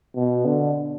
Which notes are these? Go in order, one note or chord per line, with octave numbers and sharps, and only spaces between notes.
B2
D3